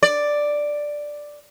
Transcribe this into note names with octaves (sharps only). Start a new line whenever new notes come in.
D5